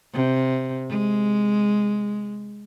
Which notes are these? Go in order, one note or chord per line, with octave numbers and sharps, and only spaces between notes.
C3
G#3